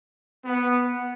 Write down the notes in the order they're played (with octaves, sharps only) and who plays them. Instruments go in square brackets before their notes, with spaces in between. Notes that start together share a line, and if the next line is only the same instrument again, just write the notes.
[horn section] B3